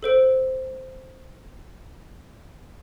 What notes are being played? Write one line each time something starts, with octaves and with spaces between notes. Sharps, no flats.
A4 C5 D7